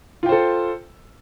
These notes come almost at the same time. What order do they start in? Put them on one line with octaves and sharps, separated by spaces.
F4 G5 C5 A4